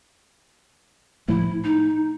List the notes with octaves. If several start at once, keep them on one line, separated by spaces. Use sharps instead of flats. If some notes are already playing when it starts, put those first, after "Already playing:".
A2 F3 A3 E4
D#4